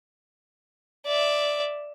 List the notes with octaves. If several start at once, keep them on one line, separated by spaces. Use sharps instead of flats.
D5 E5